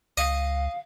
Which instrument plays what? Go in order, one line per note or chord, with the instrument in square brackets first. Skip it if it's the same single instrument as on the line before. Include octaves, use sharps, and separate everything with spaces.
[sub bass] C#2 [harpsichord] D#5 [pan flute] F5